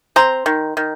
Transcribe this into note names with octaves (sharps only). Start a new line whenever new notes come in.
C4 A#5 C6
D#3
D#3